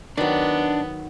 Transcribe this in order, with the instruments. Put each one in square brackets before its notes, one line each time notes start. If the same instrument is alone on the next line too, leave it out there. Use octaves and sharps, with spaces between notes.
[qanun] D#3 F#3 [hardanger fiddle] B3 [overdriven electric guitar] D4